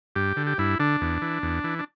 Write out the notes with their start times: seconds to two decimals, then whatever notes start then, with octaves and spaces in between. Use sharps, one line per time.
0.16 G2 G4
0.37 D3
0.47 G4
0.58 G2 E4
0.80 D3 D4
1.01 E2
1.22 E3
1.43 E2
1.64 E3
1.79 D4